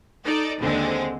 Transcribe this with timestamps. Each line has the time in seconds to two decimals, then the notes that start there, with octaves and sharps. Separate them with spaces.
0.25 D#4 A4 D5
0.59 D#2 D3 G#3 C4